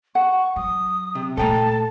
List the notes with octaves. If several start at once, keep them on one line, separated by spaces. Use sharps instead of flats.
F#5 C#6
F#3 D#6
C3
A#2 A3 A4 G5 A5 A#5